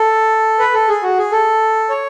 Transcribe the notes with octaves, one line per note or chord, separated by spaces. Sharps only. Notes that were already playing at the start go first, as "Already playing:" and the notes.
Already playing: A4
B4
A4
G#4
F#4
G#4
A4
C#5